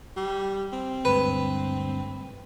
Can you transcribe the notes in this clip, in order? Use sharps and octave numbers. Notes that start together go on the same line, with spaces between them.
G3
C4
D2 G2 G#3 B4